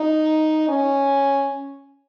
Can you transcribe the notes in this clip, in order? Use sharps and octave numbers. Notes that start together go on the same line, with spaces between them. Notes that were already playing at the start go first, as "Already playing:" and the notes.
Already playing: D#4
C#4